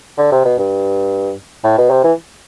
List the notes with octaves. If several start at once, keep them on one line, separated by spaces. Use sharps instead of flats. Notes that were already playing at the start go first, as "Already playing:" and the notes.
D3
C3
B2
G2
A2
B2
C3
E3